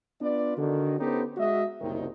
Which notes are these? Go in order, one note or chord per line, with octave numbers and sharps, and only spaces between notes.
B3 D4 F4 B4 D5
D3 D#3 F#4
B3 C#4 D#4 G4 A4 C5
G#3 F#4 D#5 E5
F#1 C2 D#3